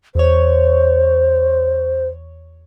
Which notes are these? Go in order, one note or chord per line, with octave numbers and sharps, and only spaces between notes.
E2 C5 C#5